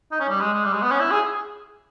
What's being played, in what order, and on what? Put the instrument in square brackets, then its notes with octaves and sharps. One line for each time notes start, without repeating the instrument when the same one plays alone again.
[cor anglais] D#4
C#4
G3
G#3
G#3
G3
G#3
B3
C#4
E4
G#4